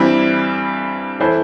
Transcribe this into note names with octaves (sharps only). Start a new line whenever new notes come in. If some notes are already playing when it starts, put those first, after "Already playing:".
Already playing: G2 E3 G3 C4 E4
E3 A3 E4 A4 C5